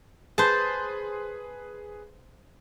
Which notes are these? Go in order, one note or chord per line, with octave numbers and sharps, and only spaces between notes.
G#4 B4 C5 A5